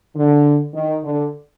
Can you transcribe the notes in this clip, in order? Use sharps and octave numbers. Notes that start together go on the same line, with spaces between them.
D3
D#3
D3